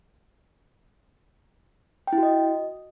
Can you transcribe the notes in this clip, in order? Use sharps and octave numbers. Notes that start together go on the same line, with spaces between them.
G5
E4
F#4
D#5